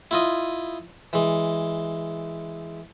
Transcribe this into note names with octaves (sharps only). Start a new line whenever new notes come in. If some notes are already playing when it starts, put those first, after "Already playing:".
E4 F4 D#5
E3 G#3